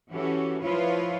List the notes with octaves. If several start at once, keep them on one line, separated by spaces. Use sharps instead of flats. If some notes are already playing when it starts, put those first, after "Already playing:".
E3 C#4 F#4 G4 A4
F3 E4 F4 B4 C#5